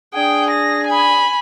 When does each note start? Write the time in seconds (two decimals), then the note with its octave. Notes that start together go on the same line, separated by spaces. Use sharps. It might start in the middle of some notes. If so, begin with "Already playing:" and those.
0.14 D4 G#4 G5
0.50 A#6
0.87 G#5 B5